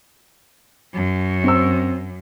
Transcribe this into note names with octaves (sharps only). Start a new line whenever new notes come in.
F#2
C4 E6